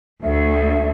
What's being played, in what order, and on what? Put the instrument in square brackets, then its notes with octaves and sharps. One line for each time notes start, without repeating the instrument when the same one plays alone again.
[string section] D2 [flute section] A4 E5